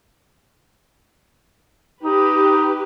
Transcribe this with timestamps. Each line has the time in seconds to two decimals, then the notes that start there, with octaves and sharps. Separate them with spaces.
2.04 D#4 G4 B4